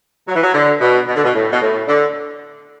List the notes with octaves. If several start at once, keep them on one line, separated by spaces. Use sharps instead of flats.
F#3
E3
F#3
D3
B2
B2
D3
B2
A2
B2
A2
D3